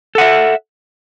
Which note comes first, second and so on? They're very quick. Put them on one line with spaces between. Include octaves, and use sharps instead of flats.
A4 F#5 E5